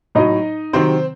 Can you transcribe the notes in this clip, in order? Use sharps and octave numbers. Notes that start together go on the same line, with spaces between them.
A2 F#3 D#4 D#5
C3 D#3 F#3 C4 C5